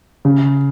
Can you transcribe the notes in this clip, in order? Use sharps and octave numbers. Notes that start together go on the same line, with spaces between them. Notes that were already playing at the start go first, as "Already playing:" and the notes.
C#3